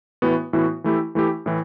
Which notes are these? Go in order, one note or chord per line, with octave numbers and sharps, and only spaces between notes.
A2 E3 B3 F#4
A2 E3 B3 F#4
E3 A3 E4 G4
E3 A3 E4 G4
A2 E3